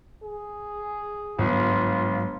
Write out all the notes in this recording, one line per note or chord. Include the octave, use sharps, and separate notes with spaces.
G#4
G1 G#2 F#3 G#3 F4